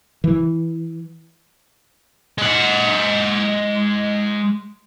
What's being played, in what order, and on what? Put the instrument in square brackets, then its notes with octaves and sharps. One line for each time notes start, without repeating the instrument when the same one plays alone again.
[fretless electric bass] E3
[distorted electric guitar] G#3 F#5